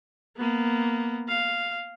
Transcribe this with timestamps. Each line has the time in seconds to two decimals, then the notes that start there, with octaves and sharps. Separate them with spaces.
0.37 A#3 B3
1.28 F5